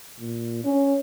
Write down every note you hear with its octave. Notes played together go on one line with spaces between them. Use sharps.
A#2
C#4